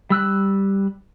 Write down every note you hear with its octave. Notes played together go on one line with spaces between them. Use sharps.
G3 E6 F#6